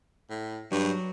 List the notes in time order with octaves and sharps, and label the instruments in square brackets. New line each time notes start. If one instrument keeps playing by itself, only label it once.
[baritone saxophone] A2
[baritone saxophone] G2 [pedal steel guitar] F#3